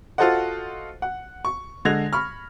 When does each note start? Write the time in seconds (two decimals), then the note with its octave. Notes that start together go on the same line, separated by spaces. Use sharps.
0.18 F4 F#4 A4 C5 D#5 F#5
1.02 F#5
1.45 C#6
1.85 D3 G#3 G#6 A#6 F7
2.13 B5 C#6 F6